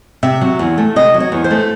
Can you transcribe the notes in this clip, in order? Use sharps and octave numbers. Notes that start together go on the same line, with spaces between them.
C3 E5
F#3
E2
A3
C3 D#5
F#3
C#5
E2
C5
A3